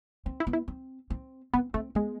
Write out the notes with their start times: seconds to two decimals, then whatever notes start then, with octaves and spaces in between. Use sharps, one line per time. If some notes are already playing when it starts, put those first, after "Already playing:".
0.26 C4
0.40 E4
0.47 B3
0.53 E4
0.68 C4
1.10 C4
1.53 B3 C4
1.74 A3 C4
1.95 G#3 B3